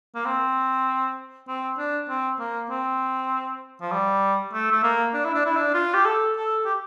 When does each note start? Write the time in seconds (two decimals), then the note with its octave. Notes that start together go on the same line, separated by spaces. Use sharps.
0.15 A#3
0.26 C4
1.48 C4
1.78 D4
2.09 C4
2.39 A#3
2.70 C4
3.81 F3
3.92 G3
4.53 A3
4.71 A3
4.83 A#3
5.14 D4
5.25 E4
5.35 D4
5.46 E4
5.56 D4
5.74 F4
5.94 G4
6.05 A4
6.36 A4
6.65 G4